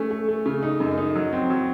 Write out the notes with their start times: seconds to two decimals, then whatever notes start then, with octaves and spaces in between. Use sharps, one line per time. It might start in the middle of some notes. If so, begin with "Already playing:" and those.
Already playing: A3 C#4
0.11 A3
0.29 A3
0.46 C#3
0.63 D#4
0.80 F#2
0.98 D#4
1.15 F#3
1.33 C4
1.50 F#3